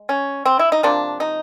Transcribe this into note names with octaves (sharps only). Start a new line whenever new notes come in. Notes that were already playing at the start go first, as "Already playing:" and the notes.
Already playing: G#3
C#4
C4
E4
D#4
C3 F3 A#3 D4
D#4